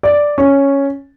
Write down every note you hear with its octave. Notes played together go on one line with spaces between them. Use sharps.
D5
C#4